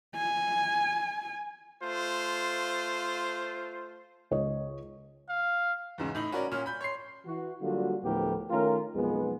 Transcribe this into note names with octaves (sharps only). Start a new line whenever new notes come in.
G#5
A3 F4 C5
C#2 C#5 D#5
F5
E2 G#2 C#3
A2 D#4 F#7
C#4 F#4 A#4 D5
A#2 C#4 F6
B5 G6
C#5 C6 C7
E3 F#4
D3 F#3 G3 A#3 F4 F#4
D2 A2 F3 B3 G4 A#4
D#3 A3 C#4 F4 A#4
B1 F2 G#3 B3